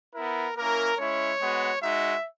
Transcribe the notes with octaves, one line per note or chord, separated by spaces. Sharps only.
B3 E4 A#4
A#3 C#4 E4 A#4
G#3 C#4 E4 C#5
G#3 B3 F#4
G#3 D#4 F#4 E5